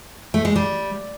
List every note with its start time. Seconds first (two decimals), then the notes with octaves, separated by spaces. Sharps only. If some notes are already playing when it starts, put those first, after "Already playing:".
0.34 A3
0.45 G#3
0.56 G3